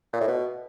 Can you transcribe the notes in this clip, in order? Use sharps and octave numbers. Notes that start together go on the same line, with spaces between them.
A#2
A2
B2